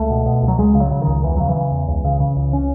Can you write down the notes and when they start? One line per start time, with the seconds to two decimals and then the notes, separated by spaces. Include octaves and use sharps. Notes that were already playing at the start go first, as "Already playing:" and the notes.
Already playing: C#2 A3
0.10 B2
0.26 B2
0.42 C#2
0.48 F#3
0.58 C#2 G#3
0.75 C#3
0.80 F#3
0.91 C#3
1.02 D#3
1.07 C#2
1.23 E2 E3
1.36 C#3 F#3
1.49 E3
1.55 C#3
1.71 E2
1.88 C#2
2.04 C#3
2.20 C#3
2.36 C#2
2.53 C#4